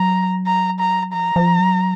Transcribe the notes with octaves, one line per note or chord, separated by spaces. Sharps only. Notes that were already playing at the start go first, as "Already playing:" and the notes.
Already playing: F#3 A#5
A#5
A#5
F3 A#5
F3
F#3